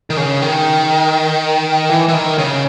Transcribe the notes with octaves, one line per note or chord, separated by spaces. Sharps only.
D#3
C#3
D#3
E3
E3
D#3
C#3